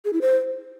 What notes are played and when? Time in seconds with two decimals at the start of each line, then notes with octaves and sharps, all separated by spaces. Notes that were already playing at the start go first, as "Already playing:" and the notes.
0.05 G#4
0.13 E4
0.21 C5